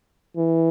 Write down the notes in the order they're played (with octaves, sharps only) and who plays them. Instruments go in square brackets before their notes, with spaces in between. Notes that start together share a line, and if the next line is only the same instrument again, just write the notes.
[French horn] E3